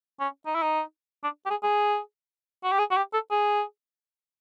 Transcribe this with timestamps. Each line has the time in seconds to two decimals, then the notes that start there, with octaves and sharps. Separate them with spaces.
0.20 C#4
0.46 D#4
0.55 E4
0.62 D#4
1.24 D4
1.46 G4
1.50 G#4
1.63 G#4
2.63 F#4
2.72 G4
2.79 G#4
2.91 F#4
2.97 G4
3.13 A4
3.31 G#4